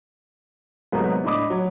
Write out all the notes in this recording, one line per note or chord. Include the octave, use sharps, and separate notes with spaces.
G#2 C3 F#3 A3 B3 D#4
A2 D4 D#5 B5 D6 D#6
F#3